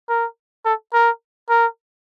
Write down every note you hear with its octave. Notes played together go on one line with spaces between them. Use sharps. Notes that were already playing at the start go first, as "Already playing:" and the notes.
A#4
A4
A#4
A#4